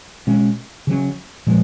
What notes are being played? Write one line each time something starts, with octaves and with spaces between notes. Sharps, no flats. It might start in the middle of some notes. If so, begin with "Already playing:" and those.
B2 G#3 C#4
C#3 F#3 C#4
A#2 F3 G#3